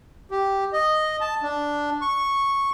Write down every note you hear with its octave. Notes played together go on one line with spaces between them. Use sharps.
G4
D#5
A5
D4
C#6